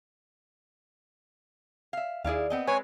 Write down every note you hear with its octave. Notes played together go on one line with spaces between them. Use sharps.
E5 F5
D#2 E4 G#4 D5 F5
B3 C4 D#5
G#3 C4 B4 C#5 G#5